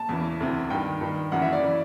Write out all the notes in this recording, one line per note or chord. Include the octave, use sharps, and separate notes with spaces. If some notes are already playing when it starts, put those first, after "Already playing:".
Already playing: A5
E2 C#3 E3
D2 C3 E3
G2 D#3 G5
G2 D#3
F#2 C#3 E3 F#5
E5
D5
C#3 E3